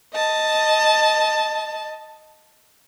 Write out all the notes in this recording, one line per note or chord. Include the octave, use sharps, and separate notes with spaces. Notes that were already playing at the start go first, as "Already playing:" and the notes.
D#5 A5